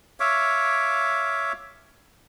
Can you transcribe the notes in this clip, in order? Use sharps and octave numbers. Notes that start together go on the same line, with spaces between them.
C#5 E5 F5 D6